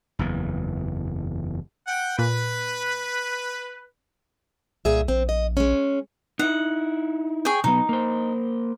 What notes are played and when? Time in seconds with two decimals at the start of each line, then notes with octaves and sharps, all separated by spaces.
0.19 F#1 E2 E3
1.87 F#5 G5
2.19 A#2 B4
4.85 C2 A#2 G#4 E5
5.08 A#1 C4
5.29 D#5
5.57 G#3 C#4
6.39 D#4 E4 F#5
7.45 G#4 C#5 G5
7.64 B2 F#3 B3 D#4
7.89 A#3 C5